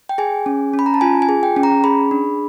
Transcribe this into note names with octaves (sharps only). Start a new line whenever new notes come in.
G5
G#4 G#5
C#4
C#4
B5
A#5
A5
F4 G#5
G#5
G#4
G5
C#4
A#5
G#4 B5
D4